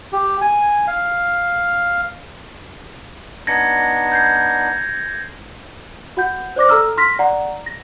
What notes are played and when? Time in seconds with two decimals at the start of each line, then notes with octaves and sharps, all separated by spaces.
0.13 G4
0.41 G#5
0.87 F5
3.47 B3 D4 D#4 G#6 A#6 C#7
4.12 G6 G#6 C7
6.17 F#4 F#5 G6
6.56 C5 D5 D6 A#6
6.69 A4 A#5 E6 F6
6.97 C6 F6 A#6 B6
7.19 D5 F#5 A#5
7.66 A#6